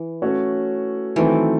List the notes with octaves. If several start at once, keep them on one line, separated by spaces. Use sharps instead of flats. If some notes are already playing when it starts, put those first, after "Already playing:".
Already playing: E3
A3 C#4 F#4 A4 C#5
D#3 E3 F#3 A3 C4